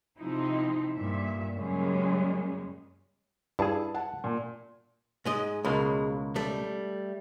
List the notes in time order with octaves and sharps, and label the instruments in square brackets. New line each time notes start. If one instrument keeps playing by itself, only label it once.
[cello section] C3 F3 C4 D#4 E4
G2 A#2 E5
F#2 A#2 C#3 G3 G#3 C#4
[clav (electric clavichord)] G2 G#4 [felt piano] E4 A5
[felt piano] F#5 A5
A#2
[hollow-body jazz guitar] G#2 G#3 D#5
[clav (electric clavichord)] C#2 B2 A#3 [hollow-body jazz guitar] G#3
[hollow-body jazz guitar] G3 A3